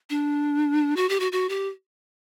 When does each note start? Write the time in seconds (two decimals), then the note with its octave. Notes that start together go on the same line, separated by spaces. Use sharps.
0.10 D4
0.96 F#4
1.09 G4
1.20 F#4
1.32 F#4
1.49 G4